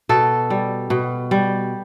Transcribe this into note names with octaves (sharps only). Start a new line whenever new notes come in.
B2 A4
G3
B2
G3